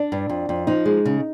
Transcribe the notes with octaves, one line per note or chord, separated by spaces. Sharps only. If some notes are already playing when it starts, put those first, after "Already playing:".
Already playing: D4
G2
F2
F2
F3 D#4
G#3
C#3